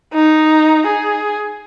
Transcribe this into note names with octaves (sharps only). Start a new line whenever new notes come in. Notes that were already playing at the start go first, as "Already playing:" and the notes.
D#4
G#4